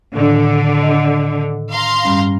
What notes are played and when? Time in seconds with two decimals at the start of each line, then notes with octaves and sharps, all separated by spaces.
0.15 A2 D3 D#3
0.82 D#5
1.72 F5 A#5 C6
2.05 G2 G3 C#4